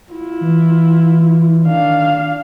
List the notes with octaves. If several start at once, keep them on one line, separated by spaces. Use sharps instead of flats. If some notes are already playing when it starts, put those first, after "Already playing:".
E4 F4
E3
D#3 D4 F5